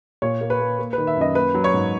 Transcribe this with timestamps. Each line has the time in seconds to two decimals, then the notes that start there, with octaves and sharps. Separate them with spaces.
0.22 A#2 C#5
0.41 A#3
0.50 B4
0.60 A#3
0.79 A#3
0.93 D#3 B4
1.07 E5
1.17 F#2 D#5
1.35 A#3 B4
1.55 F#3
1.64 C#5
1.74 G#2